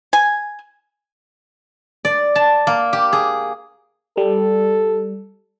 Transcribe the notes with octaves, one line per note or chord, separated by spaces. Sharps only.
G#5
D5
A5
A#3
G4
G#4
G3 A4